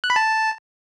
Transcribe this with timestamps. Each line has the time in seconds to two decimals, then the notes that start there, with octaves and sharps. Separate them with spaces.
0.04 F#6
0.10 B5
0.16 A5